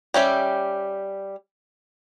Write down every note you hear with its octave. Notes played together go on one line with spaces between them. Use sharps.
G3 C#4 G4 E5